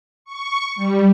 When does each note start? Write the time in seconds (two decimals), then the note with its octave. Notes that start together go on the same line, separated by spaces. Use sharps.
0.25 C#6
0.76 G3